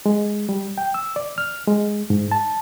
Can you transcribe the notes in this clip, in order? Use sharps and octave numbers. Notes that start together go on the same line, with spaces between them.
G#3
G3
G5
E6
D5
F6
G#3
G#2
A5